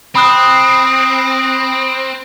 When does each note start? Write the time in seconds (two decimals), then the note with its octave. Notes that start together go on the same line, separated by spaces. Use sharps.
0.15 C4 B5 D#6 F#6